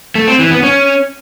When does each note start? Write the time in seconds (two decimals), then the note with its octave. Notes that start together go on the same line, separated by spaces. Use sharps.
0.15 A3
0.27 C4
0.39 E3
0.51 B3
0.63 C#4